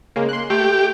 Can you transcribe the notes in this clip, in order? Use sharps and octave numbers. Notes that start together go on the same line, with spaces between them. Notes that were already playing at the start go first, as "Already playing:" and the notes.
C#3 G#3 A#3
C6 F#6
A3 G4